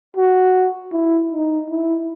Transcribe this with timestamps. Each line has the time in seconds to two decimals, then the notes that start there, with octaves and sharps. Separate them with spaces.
0.16 F#4
0.93 E4
1.32 D#4
1.70 E4